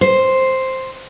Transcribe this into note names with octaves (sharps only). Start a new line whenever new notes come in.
C5